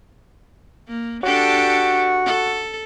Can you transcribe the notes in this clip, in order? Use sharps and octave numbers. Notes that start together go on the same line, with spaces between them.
A#3
D4 F#4 G4 A4
A4